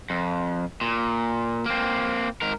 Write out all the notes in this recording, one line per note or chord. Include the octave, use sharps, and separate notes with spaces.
F2
A#2
A#3 C4
G#2 A#4